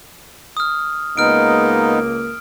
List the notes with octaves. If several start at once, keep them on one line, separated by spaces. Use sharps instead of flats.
D#6 F6
C#2 G#3 A#3 B3 D#4 F6 D7